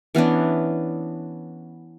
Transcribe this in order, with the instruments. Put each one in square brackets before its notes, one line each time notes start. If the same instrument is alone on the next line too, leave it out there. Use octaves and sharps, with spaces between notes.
[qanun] E3 B3 C#4 D4